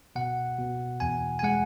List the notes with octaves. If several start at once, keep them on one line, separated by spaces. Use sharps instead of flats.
B2 F#5
B2
E2 G#5
G#5
G#3 F#5